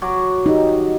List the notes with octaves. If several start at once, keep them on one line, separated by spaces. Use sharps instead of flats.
F#3 D6
D#4 G4